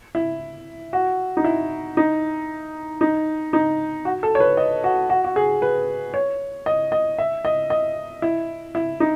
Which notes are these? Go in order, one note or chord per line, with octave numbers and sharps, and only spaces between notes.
E4
F#4
D#4
E4
D#4
D#4
D#4
F#4
A4
C#5
B4
D#5
F#4
F#4
F#4
G#4
B4
C#5
D#5
D#5
E5
D#5
D#5
E4
E4
D#4